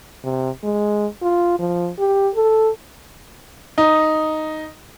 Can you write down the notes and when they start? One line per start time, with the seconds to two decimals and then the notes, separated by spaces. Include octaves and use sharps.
0.24 C3
0.63 G#3
1.22 F4
1.59 F3
1.99 G4
2.35 A4
3.78 D#4